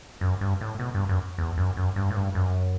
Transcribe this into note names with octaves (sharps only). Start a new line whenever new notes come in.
F#2
G2
A2
B2
G2
F#2
E2
F#2
F#2
G2
A2
G2
F#2